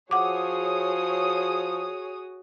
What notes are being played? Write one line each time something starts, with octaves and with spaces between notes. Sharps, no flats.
F3 F#4 G#4 C#5 F#5 D6 D#6